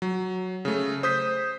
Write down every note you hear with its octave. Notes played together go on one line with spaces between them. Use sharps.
F#3
C#3 A3
C5 D#6 G6 B6